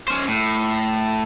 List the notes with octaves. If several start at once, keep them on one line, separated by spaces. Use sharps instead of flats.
C#4 C5
A2